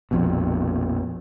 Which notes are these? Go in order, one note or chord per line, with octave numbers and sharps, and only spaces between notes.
A#1 F2 B2